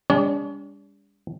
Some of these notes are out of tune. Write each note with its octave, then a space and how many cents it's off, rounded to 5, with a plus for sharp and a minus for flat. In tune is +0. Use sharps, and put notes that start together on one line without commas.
G3 +45 D4 -45 C#5 +40